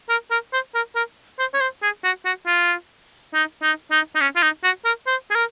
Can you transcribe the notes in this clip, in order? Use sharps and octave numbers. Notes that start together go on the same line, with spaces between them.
A#4
A#4
C5
A#4
A#4
C5
C#5
C5
G#4
F#4
F#4
F4
D#4
D#4
D#4
D#4
C#4
F4
D#4
F#4
A#4
C5
G#4
A#4